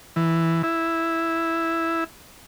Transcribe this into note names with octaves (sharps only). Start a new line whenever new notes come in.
E3
E4